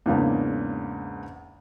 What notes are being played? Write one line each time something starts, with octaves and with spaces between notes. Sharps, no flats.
E2 G#2 C#3 A#3 D4